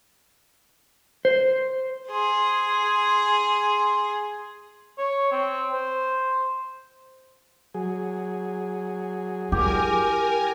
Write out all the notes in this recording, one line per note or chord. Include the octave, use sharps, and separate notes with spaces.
C5
G#4 C6
C#5
C4
C5
F#3 G#4
E4 G4 A#4 G#5